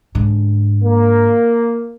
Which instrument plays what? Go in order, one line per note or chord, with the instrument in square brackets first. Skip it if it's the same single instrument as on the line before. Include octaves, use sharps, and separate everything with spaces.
[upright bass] G#2 D3
[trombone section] A#3